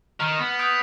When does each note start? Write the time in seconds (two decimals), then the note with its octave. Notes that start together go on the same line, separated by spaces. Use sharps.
0.20 D#3 F6
0.38 B3
0.59 D#6 G6 D7